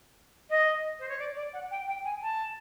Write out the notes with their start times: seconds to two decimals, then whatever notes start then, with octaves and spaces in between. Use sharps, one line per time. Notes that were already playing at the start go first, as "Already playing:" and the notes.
0.50 D#5
1.00 C5
1.09 C#5
1.19 D5
1.36 D5
1.53 F#5
1.71 G5
1.88 G5
2.05 G#5
2.22 A5